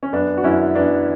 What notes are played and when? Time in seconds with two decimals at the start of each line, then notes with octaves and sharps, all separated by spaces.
0.03 C#4
0.13 F#2 B3 D4
0.37 F#4
0.44 F#2 C#4 E4
0.75 F#2 B3 D4